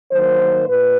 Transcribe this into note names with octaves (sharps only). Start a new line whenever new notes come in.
D#3 F#3 A#3 C5
A#2 B4